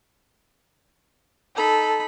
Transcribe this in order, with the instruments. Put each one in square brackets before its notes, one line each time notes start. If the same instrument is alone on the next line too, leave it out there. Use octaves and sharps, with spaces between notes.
[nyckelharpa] D#4 B5 [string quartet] A4